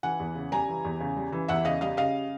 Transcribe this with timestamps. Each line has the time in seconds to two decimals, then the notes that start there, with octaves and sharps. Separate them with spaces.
0.03 E3 F#5 G#5
0.20 E2
0.35 C#3
0.52 G3 G#5 A#5
0.68 E3
0.84 E2
1.00 C#3
1.17 G3
1.32 E3
1.48 E2 E5 F#5
1.65 C#3 D#5 F5
1.81 G3 D#5 F5
1.97 C#3 D#5 F5